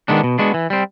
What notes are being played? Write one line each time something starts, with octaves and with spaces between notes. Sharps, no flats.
D#3 G#3 B3 D4
B2
G#3 B3 D4 F#4
E3
G3 C4